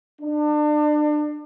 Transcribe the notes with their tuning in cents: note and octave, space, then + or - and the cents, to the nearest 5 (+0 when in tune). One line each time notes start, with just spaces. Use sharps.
D4 +35